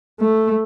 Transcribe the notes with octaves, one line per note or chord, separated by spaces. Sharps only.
A3